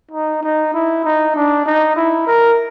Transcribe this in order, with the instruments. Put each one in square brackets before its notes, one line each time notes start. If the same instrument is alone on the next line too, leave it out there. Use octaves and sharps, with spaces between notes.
[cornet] D#4
D#4
E4
D#4
D4
D#4
E4
A#4